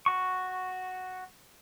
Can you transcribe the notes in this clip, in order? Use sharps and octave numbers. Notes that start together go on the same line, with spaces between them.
F#4 C#6